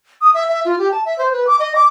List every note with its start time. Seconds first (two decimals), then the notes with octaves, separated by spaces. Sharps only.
0.21 D#6
0.34 E5
0.49 E5
0.65 F4
0.79 G4
0.92 A5
1.05 E5
1.19 C5
1.33 B4
1.47 D6
1.59 D#5
1.76 D6